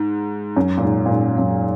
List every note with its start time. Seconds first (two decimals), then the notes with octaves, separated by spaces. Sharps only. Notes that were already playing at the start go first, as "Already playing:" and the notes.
Already playing: G#2
0.57 F#2
0.78 A#2
0.84 G#2
1.06 A#2
1.11 G#2
1.38 F#2